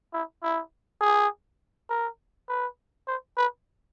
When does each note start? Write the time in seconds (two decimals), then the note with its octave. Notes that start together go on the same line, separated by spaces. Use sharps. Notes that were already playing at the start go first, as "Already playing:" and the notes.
0.13 E4
0.43 E4
1.01 G#4
1.90 A#4
2.49 B4
3.07 C5
3.38 B4